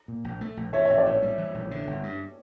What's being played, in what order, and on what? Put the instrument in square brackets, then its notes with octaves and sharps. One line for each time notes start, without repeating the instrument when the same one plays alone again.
[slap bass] A#2
A#1
A3
A#1
[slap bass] E3 [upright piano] C#5 E5
[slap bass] A#1 [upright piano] C#5 E5
[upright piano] D5
[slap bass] A2 [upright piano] C#5
[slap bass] G3
E3
A#1
D3
G1
G2